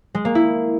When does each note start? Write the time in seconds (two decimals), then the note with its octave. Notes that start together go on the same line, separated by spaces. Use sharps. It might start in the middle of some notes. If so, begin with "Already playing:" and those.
0.15 G#3
0.25 A#3
0.35 E4